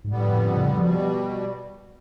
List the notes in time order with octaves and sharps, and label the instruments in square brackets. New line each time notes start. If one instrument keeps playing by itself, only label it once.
[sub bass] G#2
[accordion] F2 D3 G3 B3 [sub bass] A2
[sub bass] A2
C#3
[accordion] B2 G3 [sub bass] F3